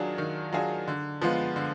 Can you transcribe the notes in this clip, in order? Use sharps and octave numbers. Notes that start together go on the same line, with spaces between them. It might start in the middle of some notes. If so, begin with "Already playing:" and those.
Already playing: D#3 F#3 D4 F4 G#4
D#3
F#3 D4 F4 G#4
D3
F3 G#3 B3 F4
D3